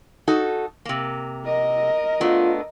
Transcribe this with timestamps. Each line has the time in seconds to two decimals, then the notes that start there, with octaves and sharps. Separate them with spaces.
0.28 D#4 F#4 A4
0.85 C3 A#3
1.45 A#4 D#5
2.21 A3 B3 D4 F4